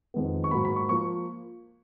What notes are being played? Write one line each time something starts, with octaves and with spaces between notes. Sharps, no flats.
F2 D#3 G#3 B3
C#6
G#2 F#3 A#3 B5
B5
C#6
F3 A#3 C#6